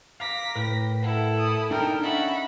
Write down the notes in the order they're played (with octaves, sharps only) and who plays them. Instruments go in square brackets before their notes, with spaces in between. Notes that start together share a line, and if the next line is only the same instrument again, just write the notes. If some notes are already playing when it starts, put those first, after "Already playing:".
[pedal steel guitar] F5 A#5 [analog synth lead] D6 [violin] A#6 B6
[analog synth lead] A2 [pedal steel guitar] A#4 B4 G5
[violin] E4 A4 [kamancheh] F#5
[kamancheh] D#6
[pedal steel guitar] D4 D#4 [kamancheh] A#4 G5
[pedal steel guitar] C#4 D#5 C#6 [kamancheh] E5 [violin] F#5 B5 [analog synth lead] A6